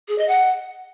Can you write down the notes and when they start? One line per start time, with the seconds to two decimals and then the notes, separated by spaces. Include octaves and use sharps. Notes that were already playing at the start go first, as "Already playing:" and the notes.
0.08 G#4
0.18 D#5
0.28 F#5